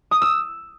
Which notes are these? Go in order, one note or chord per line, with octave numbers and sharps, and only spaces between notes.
D#6
E6